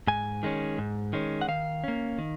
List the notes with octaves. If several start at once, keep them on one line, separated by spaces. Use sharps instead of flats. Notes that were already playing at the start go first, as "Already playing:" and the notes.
G#2 G#5
D#3 G#3 C#4
G#2
D#3 G#3 C#4
F#5
D#3 F5
A#3 C#4
D#3